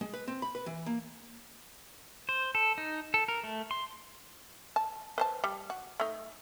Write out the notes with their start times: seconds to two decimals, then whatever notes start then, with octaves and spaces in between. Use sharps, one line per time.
0.01 G#3
0.14 B4
0.28 C4
0.42 B5
0.55 B4
0.66 E3
0.86 A#3
2.29 C5
2.55 A4
2.78 D#4
3.14 A4
3.28 A#4
3.44 A3
3.71 C6
4.76 A5
5.18 B4 C5 A5
5.44 G3
5.70 F#4
6.00 A3 D#4